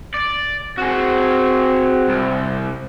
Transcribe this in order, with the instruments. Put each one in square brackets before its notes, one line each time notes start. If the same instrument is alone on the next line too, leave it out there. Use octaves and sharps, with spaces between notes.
[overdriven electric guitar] D5
[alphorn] C4 [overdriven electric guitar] F#4 G#4
[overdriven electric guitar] C2